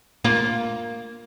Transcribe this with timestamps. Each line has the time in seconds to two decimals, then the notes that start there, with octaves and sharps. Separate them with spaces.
0.24 A#3 F4